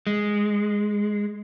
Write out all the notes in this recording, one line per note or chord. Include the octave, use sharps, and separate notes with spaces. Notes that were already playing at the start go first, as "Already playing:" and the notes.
G#3